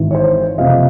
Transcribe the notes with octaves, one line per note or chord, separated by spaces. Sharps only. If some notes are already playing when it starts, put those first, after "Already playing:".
Already playing: G#1 G#2 E3
C#5
C5
F#1 F2 C3 D#5 F5